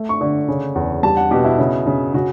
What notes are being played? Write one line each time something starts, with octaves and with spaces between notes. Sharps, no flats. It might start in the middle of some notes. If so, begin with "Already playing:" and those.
Already playing: A3
C#6
D3
C#3
E2
G3 A5
F#5
B2 G4
E4
C#3
C#3
C#3 F#4